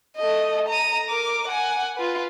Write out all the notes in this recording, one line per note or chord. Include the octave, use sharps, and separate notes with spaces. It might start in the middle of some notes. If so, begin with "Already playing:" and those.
A3 D#5
A#5 D#7
A#4 D6
F#5 G#5
F4 B4